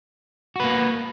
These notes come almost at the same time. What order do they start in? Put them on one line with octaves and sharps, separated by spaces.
F#4 B4 A#3